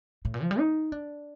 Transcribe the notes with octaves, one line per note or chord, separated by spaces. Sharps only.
A2
A#2
F3
G3
D#4
D4